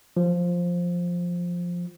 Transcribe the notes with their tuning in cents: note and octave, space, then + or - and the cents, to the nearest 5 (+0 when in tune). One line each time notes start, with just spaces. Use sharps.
F3 +5